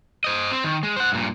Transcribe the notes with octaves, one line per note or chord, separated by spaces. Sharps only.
C5 D#5
C4
D#3
G#3
C5 F#5
G2 A#2